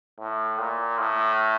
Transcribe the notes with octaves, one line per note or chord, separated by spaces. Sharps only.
A2
A#2
A2